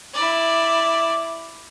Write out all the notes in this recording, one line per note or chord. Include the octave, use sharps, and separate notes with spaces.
E4 D5